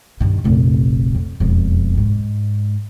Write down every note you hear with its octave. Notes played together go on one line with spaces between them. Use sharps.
G2 D#3
F1 A#1
F2
E1 F2
G#2